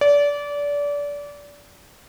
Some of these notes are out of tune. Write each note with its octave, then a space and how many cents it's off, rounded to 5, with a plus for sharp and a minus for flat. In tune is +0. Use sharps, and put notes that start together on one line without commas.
D5 -25